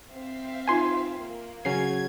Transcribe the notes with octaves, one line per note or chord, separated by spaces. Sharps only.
C4 E5 F5
D#4 F4 B4 G#5 C6
A#3
C#3 F#3 C#4 G#6 C7